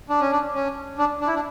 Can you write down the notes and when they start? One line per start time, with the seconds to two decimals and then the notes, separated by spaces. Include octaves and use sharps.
0.09 D4
0.20 C#4
0.31 D4
0.54 C#4
0.98 D4
1.21 D4
1.27 E4
1.35 D4